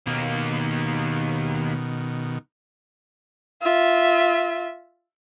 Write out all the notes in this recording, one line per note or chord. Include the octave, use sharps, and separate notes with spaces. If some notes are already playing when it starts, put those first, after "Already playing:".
D#2 B2 D#3 A#3
F4 E5